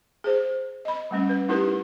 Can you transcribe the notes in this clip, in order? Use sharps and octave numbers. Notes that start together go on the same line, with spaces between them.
G#4 C5
D#5 B5
G3 A3 C#4
B4
A3 D#4 E4 G4 A#4 B4